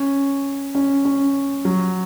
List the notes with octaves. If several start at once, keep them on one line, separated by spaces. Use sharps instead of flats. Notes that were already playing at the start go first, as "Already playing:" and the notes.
Already playing: C#4
C#4
C#4
F#3